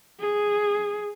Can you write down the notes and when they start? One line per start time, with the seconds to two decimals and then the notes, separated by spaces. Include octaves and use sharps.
0.20 G#4